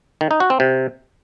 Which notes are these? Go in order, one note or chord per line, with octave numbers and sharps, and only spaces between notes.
D#3
D#4
F#4
C4
C3